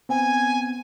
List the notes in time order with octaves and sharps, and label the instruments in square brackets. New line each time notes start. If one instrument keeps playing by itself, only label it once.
[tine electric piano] B3 C4 [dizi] G#5